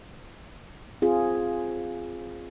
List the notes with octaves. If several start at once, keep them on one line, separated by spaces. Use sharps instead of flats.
C4 F4 G#4